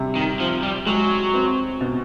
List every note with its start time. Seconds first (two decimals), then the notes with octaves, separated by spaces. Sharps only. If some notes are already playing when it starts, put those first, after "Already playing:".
Already playing: C3 G3
0.16 D#3
0.40 C3 F3
0.63 G3
0.86 F#3 G#3
1.34 C4
1.81 B2